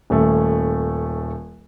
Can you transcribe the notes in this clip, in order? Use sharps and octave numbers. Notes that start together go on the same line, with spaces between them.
D#1 A3